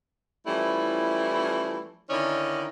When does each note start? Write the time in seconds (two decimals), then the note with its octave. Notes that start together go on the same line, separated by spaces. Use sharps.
0.47 E3 F3 G3 A3 C#4 E4
2.10 D3 D#3 C#4 D#4 E4 D5